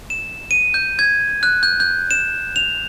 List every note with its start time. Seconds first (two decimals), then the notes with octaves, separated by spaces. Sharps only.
0.10 E7
0.51 D#7
0.74 G6
0.99 G#6
1.43 F#6
1.63 G6
1.80 G6
2.11 E7
2.56 F7